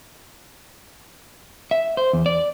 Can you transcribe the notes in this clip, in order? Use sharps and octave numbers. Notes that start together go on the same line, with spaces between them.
E5
C5
E2
D5